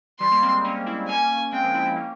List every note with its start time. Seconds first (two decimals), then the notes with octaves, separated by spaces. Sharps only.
0.20 E3 G3 C6
0.31 G3 A#3
0.42 G#3 C4
0.64 A#3 C#4
0.86 C4 E4
1.08 A#3 C#4 G#5
1.52 G#3 C4 G5
1.63 F3 G#3
1.74 C4 E4
1.85 C4 E4
1.96 A#3 C#4